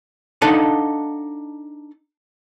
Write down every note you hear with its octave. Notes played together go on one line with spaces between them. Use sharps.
D4 D#4 A4 D#5 F5 F#5